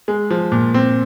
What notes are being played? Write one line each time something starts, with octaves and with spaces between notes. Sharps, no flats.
G#3
F3
A#2
C4